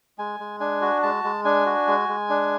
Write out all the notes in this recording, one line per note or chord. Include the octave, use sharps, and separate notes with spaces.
G#3 G#5
G#3
D4 G#5
F#4
G#3 A5
G#3
D4 G#5
F#4
G#3
G#3
D4